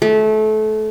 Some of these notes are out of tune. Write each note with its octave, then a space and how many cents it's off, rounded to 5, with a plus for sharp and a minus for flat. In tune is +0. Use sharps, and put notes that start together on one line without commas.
A3 -25